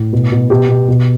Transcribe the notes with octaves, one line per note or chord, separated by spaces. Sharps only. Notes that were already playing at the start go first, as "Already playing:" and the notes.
Already playing: A2
B2
B2
B2 G4
B2
B2